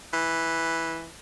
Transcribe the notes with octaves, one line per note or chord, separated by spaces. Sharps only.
E3